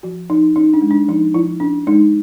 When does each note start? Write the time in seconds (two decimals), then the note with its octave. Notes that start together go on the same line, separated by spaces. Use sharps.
0.03 F3 F#4
0.30 F3 D#4
0.56 C#4 D#4
0.74 D4
0.82 G#3
0.91 D4
1.08 F3 D#4
1.34 F3 E4
1.60 C#4 D4
1.87 G#3 D#4